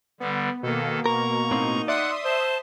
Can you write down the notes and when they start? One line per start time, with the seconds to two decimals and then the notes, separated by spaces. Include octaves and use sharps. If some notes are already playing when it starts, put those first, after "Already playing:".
0.20 D3 G3 B3
0.63 B2 D#3 A#3 A4
1.06 A#4 A#5 C#6
1.51 A2 C4 D#4
1.88 D5 E5 F#5 C6 D#6 F#6
2.25 C5 A5